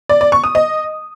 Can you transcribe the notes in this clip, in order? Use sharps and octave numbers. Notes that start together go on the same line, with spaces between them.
D5
D5
C#6
D#6
D#5